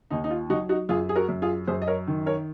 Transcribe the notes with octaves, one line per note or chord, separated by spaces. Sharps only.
D#2 D#4
D#4
F4
F#3 D#4 F#4
D#4 F#4
F#2 F4 G#4
G#4
F#4 A#4
F#2
F4 G#4
F#2 G#4 C5
D#5
A#4 C#5
D#3
A#4 C#5